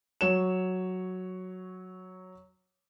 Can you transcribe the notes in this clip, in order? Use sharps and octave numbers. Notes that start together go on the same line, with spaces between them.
F#3 C#5 E7